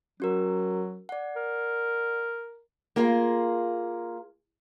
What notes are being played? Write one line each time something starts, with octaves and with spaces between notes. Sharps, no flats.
F#3 C#4 F#4 A#4
D5 F#5
A#4
A#3 F4 G#4 A#4